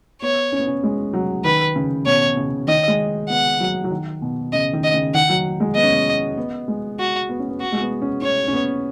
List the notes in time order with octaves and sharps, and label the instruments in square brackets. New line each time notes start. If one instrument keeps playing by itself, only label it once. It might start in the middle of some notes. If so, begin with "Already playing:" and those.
[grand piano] B3 [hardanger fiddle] C#5
[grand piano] C#4
B3
C#4
G#3
F#3
[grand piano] D#3 [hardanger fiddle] B4
[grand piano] C#3
[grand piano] B2 [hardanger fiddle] C#5
[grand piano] C#3
[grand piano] D#3 [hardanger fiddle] D#5
[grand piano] G#3
[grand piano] B3 [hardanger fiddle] F#5
[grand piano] F#3
F#3
D#3
B2
[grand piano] C#3 [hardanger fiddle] D#5
[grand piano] D#3
[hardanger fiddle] D#5
[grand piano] C#3
[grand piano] D#3 [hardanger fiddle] F#5
[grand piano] F#3
G#3
[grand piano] B3 [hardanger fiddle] D#5
[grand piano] C#4
B3
B3
G#3
[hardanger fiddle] F#4
[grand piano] B3
C#4
B3
[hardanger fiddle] F#4
[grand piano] G#3
B3
C#4
[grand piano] C#4 [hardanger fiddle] C#5
[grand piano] C#4
B3